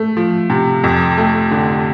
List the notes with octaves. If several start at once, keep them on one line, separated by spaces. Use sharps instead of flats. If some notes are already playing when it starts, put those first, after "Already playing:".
Already playing: A3
F3
C3
F2
A3
D3